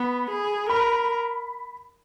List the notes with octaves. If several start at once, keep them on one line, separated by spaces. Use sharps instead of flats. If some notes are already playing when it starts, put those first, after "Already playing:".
Already playing: B3 B5
G#4
A#4 B5